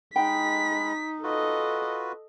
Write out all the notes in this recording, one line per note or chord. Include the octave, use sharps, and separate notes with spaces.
G#3 D#4 G5 B5 B6
F4 F#4 A4 B4 D#5